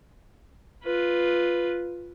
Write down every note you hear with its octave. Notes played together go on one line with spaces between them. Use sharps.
F4 B4